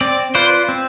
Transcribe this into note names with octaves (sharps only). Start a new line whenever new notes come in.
C4 D5
F4 B4 C5 D5
C4